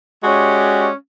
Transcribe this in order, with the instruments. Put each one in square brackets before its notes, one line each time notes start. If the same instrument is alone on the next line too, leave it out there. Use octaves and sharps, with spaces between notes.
[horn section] G#3 C#4 F#4 G4 D5